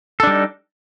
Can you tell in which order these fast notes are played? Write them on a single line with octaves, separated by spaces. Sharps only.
A4 D4 G3 D#4